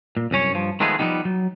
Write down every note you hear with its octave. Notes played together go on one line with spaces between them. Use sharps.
A#2
C2 F#2 C#4 C#5
G2 F3
D#3 F3 G#3 A3 B3 G#4
F3 G3 A#3 B3 D#4 G4
F#3